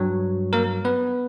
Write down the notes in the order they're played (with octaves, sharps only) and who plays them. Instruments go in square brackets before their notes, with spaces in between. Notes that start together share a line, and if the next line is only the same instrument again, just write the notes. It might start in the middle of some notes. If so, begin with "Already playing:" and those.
Already playing: [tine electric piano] G2 F#3
A#3 A#4
B3 B4